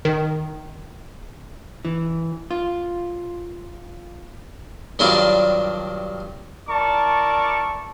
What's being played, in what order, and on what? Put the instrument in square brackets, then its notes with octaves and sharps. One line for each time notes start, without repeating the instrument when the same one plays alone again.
[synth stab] D#3
[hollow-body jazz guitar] E3
F4
[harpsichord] G2 D#3 F#3 G3 D4 F4
[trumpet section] E4 A#4 D5 A5 C#6